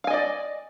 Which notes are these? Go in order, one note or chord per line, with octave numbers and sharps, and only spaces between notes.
D5 D#5 F5 G#5